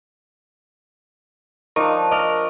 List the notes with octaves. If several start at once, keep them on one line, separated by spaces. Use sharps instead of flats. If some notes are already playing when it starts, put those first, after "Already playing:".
F3 D4 D#4 A#4 D5 C#6
A#4 D#5 D6